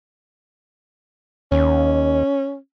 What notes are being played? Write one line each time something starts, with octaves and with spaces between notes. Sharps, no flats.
D#2 C#4